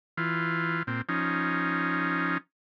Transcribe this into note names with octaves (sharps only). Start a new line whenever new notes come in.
E3 F4
A#2 C4
F3 C#4 D#4